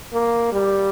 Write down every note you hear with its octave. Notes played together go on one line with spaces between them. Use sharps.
A#3
G3